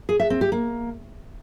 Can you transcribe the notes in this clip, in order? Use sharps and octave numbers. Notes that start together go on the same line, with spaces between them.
G#4
E5
C4
G4
A#3